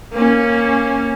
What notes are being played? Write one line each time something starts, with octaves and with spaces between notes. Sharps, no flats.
A#3 C#4